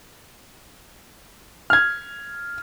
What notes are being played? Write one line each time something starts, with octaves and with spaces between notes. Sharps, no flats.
F6 G#6